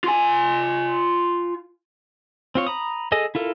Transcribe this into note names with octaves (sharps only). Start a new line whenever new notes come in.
F4 G#5
C4 F4 C#5
A#5 B5 D#6
G#4 A4 D#5 G#5
E4 F4 A4 A#4